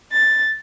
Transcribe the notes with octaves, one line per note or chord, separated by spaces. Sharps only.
A6